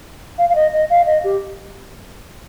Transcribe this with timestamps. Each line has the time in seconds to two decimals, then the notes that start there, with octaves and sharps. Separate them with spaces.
0.38 F5
0.50 F5
0.55 D#5
0.73 D#5
0.90 F5
1.06 D#5
1.24 G4